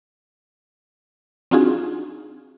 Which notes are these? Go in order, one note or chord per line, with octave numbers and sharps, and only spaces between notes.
C4 D4 D#4 F4 F#4 G#4